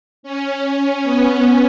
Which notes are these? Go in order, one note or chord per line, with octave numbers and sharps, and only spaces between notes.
C#4
B3